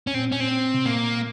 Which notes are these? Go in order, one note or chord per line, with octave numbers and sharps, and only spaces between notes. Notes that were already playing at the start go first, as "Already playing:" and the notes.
C#4
A#2 C4
C#4
C4
C3
A#2 A#3